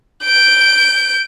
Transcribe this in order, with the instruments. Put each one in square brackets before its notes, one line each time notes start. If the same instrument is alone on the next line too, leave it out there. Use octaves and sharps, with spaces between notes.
[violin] G6 D7